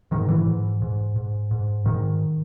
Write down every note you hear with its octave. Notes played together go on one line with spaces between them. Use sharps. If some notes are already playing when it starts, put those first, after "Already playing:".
G#2 D#3
E3
G#2
G#2
G#2
G#2
G#2 D#3